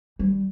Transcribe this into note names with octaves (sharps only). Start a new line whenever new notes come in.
G3